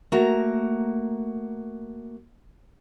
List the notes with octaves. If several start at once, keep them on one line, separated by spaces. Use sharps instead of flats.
A3 A#3 F#4 A#5